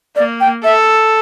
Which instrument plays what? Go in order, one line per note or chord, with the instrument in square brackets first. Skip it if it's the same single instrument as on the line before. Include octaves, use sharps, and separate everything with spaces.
[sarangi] A#3 [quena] D5
[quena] G5
[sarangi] A4 [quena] E5